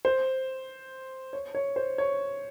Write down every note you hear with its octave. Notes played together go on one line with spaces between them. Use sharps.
C5
C#5
C#5
C5
C#5